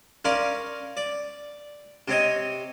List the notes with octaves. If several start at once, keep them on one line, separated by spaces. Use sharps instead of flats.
C#4 A#4 D5 F5 C6
D5
C3 C4 C#5 D#5